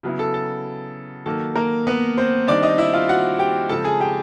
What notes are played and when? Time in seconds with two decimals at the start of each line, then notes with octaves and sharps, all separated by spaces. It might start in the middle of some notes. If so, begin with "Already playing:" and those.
0.03 C#3 F#3 B3 E4
0.19 A4
0.34 A4
1.26 D#3 F#3 A#3 A4
1.56 A#3 A#4
1.87 B3 B4
2.17 C4 C5
2.47 D#3 G3 C4 D4 D#4 D5
2.63 D#4 D#5
2.78 E4 E5
2.94 F4 F5
3.09 F#4 F#5
3.39 G4 G5
3.69 C#3 F3 G#3 C4 A4 A5
3.84 G#4 G#5
4.00 G4 G5